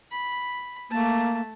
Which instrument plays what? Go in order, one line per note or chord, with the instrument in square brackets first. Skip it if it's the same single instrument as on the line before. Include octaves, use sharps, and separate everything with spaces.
[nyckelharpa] B5
[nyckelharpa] A3 A5 [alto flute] A#3